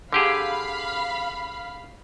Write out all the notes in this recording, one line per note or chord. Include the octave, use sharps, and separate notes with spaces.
D3 G4 G#4 F5 B5